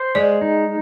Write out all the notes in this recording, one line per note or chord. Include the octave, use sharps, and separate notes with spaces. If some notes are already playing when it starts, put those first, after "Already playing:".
Already playing: C5
G#3 D5
D#4